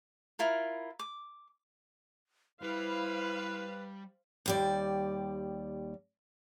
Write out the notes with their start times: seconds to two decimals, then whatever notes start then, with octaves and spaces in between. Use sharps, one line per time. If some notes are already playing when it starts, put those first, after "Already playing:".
0.39 E4 F4 A#4
0.99 D6
2.61 G3 E4 B4 C5 F5
4.46 D#2 G3 D5